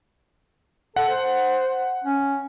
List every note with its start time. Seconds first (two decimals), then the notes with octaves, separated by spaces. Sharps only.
0.96 A4 F#5
1.09 C5
2.04 C#4